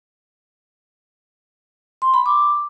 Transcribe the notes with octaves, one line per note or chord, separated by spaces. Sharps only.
C6
B5
D6